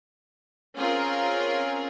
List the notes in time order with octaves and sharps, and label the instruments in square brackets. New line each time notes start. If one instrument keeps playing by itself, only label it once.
[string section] C4 C#4 F4 G#4 A#4